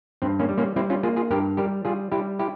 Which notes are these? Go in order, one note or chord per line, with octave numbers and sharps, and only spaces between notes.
G2 C4
A#3 C#4
G3
A#3 C#4
G3 C4 E4
C#4 F4
A#3 F4 G#4
F4 G#4
G2 G4 A#4
G3 G4 A#4
G3 F4 G#4
G3 E4 G4
E4 G4